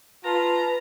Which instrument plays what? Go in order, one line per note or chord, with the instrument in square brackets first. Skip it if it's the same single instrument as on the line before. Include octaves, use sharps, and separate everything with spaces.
[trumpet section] F4 [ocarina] B4 [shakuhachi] A5 [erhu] A#5